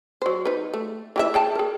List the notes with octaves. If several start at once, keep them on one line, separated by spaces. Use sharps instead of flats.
F#3 C5
D#4 B4
A3
E3 G4 E5
G#4 G5 A5
G#4 A#4